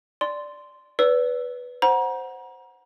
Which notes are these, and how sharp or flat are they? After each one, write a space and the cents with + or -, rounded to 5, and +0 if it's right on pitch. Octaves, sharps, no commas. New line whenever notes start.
D5 +0 C6 -10
B4 +0 D5 -35 E6 +10
C5 +0 F#5 +0 A#5 +35